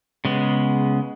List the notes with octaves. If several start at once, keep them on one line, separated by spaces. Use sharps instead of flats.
C#3 G#3 B3